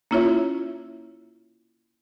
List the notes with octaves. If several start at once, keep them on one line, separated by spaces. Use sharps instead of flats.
A#3 C#4 E4 F4 C#5 E5